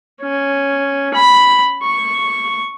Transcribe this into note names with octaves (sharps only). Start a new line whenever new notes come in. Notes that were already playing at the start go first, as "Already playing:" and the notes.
C#4
B5
C#6